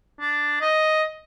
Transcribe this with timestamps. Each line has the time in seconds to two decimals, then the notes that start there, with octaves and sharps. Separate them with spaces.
0.20 D4
0.61 D#5